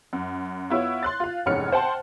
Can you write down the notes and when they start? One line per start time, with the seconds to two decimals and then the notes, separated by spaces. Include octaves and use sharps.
0.13 F#2
0.70 B3 E4 F4 C#5
1.03 C6 F#6 A6
1.20 F4 F5
1.46 F1 E2 G#2 C#4 F6 C#7
1.72 C5 F#5 G5 A5 C6